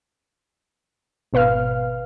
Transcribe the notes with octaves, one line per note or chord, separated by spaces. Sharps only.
G#1 B2 B4 F5 F6